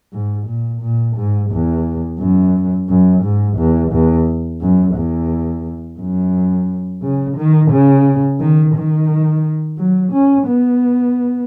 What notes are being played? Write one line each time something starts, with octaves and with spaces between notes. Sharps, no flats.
G#2
A#2
A#2
G#2
E2
F#2
F#2
G#2
E2
E2
F#2
E2
F#2
C#3
D#3
C#3
D#3
D#3
F#3
C#4
B3